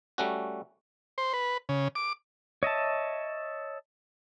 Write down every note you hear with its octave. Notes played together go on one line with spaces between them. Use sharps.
G3 A3 C#4 F#4
C5
B4
C#3
D6
C#5 D#5 E5 A5